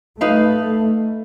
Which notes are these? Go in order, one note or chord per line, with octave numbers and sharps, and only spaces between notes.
A3 D#4 B4 F5